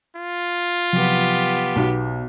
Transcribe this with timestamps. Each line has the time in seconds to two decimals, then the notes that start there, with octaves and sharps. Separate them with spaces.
0.16 F4
0.93 C3 F3 F#3 B3 G4
1.76 B1